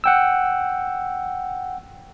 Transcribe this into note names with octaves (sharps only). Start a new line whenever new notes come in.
F#5 G5 E6